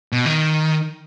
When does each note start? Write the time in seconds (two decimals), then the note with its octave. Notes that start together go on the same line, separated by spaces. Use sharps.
0.12 B2
0.26 D#3